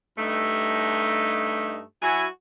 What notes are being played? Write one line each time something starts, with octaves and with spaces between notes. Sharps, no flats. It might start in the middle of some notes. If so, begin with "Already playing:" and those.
G2 A3 D#4
F#3 E4 F#4 G#5